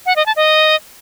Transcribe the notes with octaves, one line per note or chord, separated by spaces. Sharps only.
F#5
D#5
A5
D#5